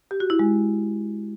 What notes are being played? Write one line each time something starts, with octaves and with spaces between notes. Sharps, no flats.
G4
F#4
E4
G#3